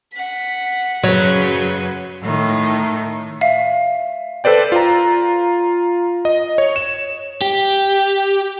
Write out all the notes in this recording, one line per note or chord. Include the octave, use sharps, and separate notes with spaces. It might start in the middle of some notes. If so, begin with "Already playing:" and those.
F#5 B6
F#2 C#3 F#3 B4
A2 D#3
E5 F5
A4 B4 C5 D5 G5
F4 A#5
D#5
C#5
E7
G4